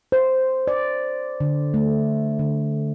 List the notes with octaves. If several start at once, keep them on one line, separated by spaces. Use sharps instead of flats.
C5
D5
D3
A3
D3